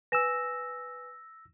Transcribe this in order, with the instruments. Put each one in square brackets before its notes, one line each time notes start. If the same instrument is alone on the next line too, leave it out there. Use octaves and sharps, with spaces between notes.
[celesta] B4 G#5 E7 [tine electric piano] E6 A#6